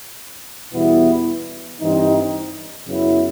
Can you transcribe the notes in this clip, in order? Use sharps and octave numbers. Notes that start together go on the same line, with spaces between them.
E2 B2 G3 B3 E4
G2 E3 G3 C4 D#4
F#2 C#3 F#3 B3 E4